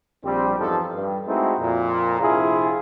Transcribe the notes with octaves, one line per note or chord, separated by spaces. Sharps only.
A#1 G3 C4
E2 G2 F3 D#4 G4 A4
G2
G#3 A3 C4 D#4 E4 F#4
F2 A#2
A#1 C3 E4 F4 G#4